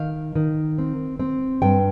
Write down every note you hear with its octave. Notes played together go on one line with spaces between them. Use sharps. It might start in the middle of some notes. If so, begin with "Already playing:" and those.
Already playing: D#3 F5
D#3
C4
C4
G2 G5